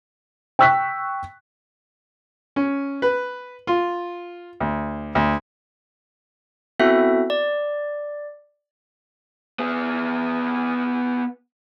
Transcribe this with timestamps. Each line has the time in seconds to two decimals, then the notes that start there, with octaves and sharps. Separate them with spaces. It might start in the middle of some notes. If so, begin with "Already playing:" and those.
0.59 G5 C#6 E6 F#6 B6
2.56 C#4
3.02 B4
3.67 F4
4.60 D2
5.15 D2
6.80 B3 C4 E4 F#4 A4 E5
7.30 D5
9.59 B3 G#4